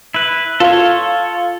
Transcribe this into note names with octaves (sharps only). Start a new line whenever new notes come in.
E4 B4
F4 A4 C#5